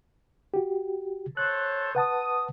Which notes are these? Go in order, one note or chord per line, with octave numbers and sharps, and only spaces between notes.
F#4 G4
A4 C5 C#5 F#6
B4 F#5 A5 D#6